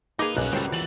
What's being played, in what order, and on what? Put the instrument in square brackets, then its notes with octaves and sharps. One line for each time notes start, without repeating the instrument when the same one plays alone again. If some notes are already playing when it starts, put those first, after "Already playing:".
[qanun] A#3 A#4 B4 [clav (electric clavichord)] D#4 G#4 [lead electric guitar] D#5 A#5 [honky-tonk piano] D6
[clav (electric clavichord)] B1 [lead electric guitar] G2 C#4 [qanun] G#4 [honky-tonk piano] F#6
[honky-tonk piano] C#2 [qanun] F#3 G3 [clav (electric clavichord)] A4 C5 G5
[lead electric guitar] E3 [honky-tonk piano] A6 F#7